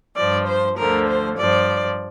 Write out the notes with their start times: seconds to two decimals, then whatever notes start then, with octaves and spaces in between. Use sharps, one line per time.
0.16 G2 F3 D5
0.47 C5
0.76 D2 D3 F3 A#4
1.07 C5
1.37 G2 F3 D5